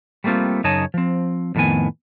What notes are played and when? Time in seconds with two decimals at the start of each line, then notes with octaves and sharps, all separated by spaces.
0.24 G3 A3 A#3 C4 F4
0.64 F#2 C#3 D#4 C#5 D#5 A5
0.94 F3 C4
1.55 F2 A2 D#3 B3 G#5